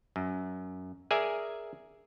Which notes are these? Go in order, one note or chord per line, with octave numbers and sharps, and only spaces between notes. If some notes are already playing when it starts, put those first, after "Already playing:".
F#2
G#4 A#4 D5 E5 G#5